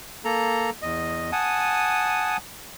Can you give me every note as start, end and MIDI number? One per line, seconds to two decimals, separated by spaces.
0.25 0.70 58
0.25 0.70 69
0.25 0.70 82
0.82 1.31 40
0.82 1.31 75
1.32 2.37 78
1.32 2.37 80
1.32 2.37 81
1.32 2.37 87